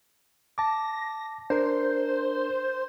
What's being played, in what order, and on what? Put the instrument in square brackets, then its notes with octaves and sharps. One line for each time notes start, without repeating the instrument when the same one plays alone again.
[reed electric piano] A5 D6 [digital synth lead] A#6
[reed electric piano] D4 A#4 [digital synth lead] C5